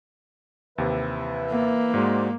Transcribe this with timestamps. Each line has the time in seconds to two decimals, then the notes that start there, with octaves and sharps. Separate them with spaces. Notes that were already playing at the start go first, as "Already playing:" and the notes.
0.78 D#2 C3 E3 B4 E5
1.50 A#3
1.94 G#2 G#3 F#4 C5 D5